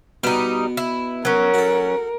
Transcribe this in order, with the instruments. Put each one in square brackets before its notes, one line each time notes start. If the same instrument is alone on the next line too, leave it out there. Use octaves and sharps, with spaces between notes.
[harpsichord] B2 B3 [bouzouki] G3 D#4
[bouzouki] E4
[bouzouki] F#3 C#4 [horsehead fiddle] A#4
[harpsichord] F#4 A4